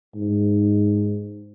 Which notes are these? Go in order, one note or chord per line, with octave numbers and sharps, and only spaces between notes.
G#2